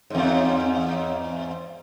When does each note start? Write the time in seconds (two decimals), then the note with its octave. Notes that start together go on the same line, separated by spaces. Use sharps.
0.10 E2 G#2